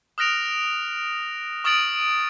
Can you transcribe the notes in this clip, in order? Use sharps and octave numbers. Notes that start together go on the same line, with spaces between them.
D#6 F6 F#6 A#6 D7 F7
C#6 D#6 F6 A6 D7 F#7